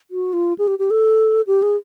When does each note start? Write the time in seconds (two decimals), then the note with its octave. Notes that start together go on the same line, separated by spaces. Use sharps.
0.11 F#4
0.33 F4
0.59 G#4
0.68 G4
0.79 G4
0.90 A4
1.47 G4
1.62 G#4